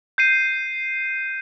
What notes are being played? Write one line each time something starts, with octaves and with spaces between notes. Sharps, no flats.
G6 C7 D#7